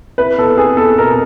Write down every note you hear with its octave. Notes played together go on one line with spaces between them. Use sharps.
E4 B4
B3 A4
B3 G#4
B3 A4
B2 A#4